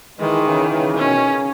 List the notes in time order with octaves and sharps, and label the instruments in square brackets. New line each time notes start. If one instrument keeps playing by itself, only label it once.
[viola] D#3 [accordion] E3 G#3
[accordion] C#3 E3
C#3 E3
[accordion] B2 D#3 [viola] C#4
[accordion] C#3